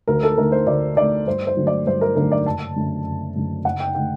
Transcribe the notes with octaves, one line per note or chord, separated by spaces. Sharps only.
D2 A#4
A4
D3 A3 A#4
C5
D2 D5
D3 A3 D5
G2 C5
C5
D3 F#3 A3
D5
G2 C5
A#4
D3 F#3 A3 A#4
D5
F#1 A5
F#2 D3 A3
F#1
F#2 D3 A3
F#1 F#5
G5
D3 A3 G5